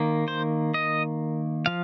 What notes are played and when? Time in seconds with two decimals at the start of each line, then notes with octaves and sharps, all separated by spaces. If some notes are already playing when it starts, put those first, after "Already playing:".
Already playing: D#3 A#3
0.28 C5
0.74 D#5
1.66 F3 F5